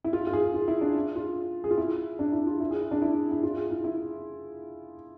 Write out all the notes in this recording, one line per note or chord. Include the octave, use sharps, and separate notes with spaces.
E4
F4
F4
G#4
F4
E4
D4
F4
G#4
F4
E4
D4
E4
F4
E4
G#4
E4
D4
E4
E4
F4
G#4
E4
E4